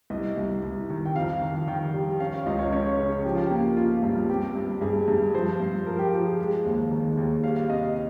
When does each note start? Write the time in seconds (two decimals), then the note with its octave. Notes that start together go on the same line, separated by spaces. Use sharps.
0.10 C2 D#5
0.37 C2
0.63 C2
0.90 D#3
1.05 G5
1.16 F2 F5
1.41 D#3
1.67 D#3 G5
1.93 G3
2.20 C#4 F5
2.34 F5
2.46 C#2 D#5
2.59 C#5
2.72 C#4 C#5
2.99 C#3
3.24 F3 G4
3.35 F4
3.46 A#3 G4
3.77 A#3 F4
4.03 G2
4.29 C4 G4
4.55 G2
4.81 G2 G#4
5.08 G2
5.35 F3 C5
5.60 G2
5.86 F3 A#4
5.99 G4
6.13 F3
6.26 G#4
6.39 G#3
6.65 D#2
6.91 D#3
7.17 D#2
7.44 G3 F5
7.56 F5
7.69 C3 D#5
7.83 D#5